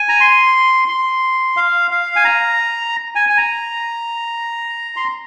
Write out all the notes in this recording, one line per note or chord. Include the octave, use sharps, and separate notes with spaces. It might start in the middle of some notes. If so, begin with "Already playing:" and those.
Already playing: G#5
A#5
C6
C6
F5
F5
G#5
A#5
G#5
G#5
A#5
C6